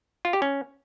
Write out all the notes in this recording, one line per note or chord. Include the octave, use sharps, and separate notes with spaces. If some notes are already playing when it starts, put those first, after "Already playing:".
F4
G4
C#4